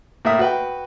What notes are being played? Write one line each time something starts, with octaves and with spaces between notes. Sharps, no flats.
A2 A#3 E5 D#6
F#4 B4 G5